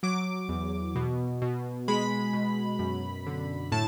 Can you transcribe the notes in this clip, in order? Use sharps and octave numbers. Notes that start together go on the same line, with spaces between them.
F#3 D6
E2
B2
B2
G#3 B5
B2
F#2
D3
A2 A5